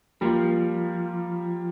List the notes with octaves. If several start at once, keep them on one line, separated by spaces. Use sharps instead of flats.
F3 G3 A#3 F4